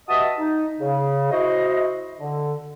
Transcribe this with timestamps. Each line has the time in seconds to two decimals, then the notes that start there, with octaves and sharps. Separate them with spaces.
0.09 G2 F#4 D#5 E5 A5 D#6
0.38 D#4
0.79 C#3
1.31 E4 F#4 C5 D#5
2.19 D3